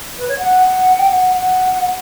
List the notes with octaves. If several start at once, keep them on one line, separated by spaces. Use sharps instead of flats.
B4
C#5
F#5
G5
F#5
F#5